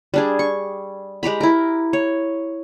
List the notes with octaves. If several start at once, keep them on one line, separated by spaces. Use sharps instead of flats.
G3 D4 G#4
C#6
G#3 G4 A#5 B5
E4 A#4
C#5